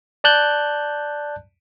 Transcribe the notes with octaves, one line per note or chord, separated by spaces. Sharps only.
D5 A5 F#6 G6